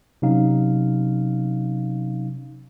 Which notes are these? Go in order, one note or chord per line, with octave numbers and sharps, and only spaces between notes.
C3 F#3 C#4 D#4 F5